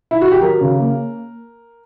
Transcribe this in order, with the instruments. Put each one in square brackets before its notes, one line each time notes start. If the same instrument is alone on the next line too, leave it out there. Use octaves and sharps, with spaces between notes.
[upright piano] E4
F#4
G4
F#3 A#4
C#3
A#3